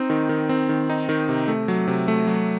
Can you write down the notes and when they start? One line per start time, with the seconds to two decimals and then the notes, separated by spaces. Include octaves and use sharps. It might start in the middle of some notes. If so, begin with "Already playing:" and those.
Already playing: C4 D#4
0.10 D#3
0.29 D#3
0.49 C4
0.69 D#3
0.90 D#4
1.09 D#3
1.29 C3
1.48 A3
1.68 F#3
1.88 C3
2.08 A3
2.27 F#3